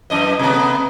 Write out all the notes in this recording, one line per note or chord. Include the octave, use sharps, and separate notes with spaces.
F#2 E3 D#5
C3 A3 B3